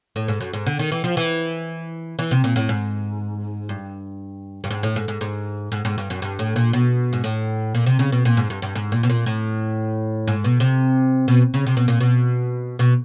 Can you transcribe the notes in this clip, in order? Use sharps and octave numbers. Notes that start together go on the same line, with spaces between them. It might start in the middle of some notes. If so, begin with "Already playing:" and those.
A2
G#2
F#2
G#2
D3
D#3
E3
F3
E3
E3
C3
A#2
A2
G#2
G2
G2
G#2
A2
G#2
G#2
G#2
G#2
G#2
G2
F#2
G2
A2
A#2
B2
G#2
A2
A#2
C3
C#3
B2
A#2
G#2
G2
G2
G#2
A#2
B2
A#2
A2
G#2
B2
C3
B2
C#3
C3
B2
A#2
B2
B2